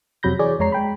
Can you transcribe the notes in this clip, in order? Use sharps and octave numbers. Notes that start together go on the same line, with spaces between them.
F2 C3 F#3 B5 G6 A#6
E3 G#4 C#5 D5
F2 G#3 C#5 A#5 C7
G#3 G5 B5